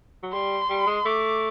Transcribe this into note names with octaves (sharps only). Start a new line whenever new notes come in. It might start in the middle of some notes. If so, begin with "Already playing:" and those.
F#3
G3 C6
G3
G#3
A3 D6